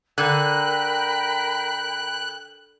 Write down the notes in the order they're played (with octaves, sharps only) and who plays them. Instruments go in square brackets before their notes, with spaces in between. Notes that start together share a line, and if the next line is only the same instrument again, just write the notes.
[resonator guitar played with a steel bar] D3 [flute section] A#4 G5 B5 [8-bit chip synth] F#6